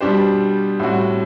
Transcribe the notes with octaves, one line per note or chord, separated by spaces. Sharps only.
B2 G3 D4 G4 C5
A2 G3 C4 F#4